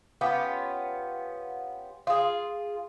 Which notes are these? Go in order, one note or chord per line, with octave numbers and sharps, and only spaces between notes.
B3 C#4 F4 G4
F4 G#4